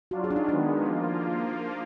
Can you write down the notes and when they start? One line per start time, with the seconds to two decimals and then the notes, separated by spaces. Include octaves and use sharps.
0.11 F#3 D4 F4 F#4
0.24 G#4
0.31 D4
0.36 D#4
0.49 D#3 G#3 B3 D4
0.85 F3 A#3 F4